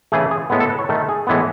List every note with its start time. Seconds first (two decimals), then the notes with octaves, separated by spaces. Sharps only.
0.12 C#3 E3 A3 G#4
0.31 G#4
0.50 A2 G#3 B3
0.60 A4
0.70 B4
0.79 C#5
0.89 D#3 A3 A4
1.09 G#4
1.27 A2 E3 G#3 B3